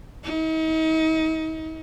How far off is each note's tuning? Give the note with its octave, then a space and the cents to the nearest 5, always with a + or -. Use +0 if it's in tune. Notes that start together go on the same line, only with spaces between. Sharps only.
D#4 +40